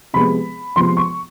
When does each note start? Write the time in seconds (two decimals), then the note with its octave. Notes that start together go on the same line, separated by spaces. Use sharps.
0.13 C3 F3 G#3 B3 B5
0.76 C3 F3 G#3 B3 C6
0.97 C#6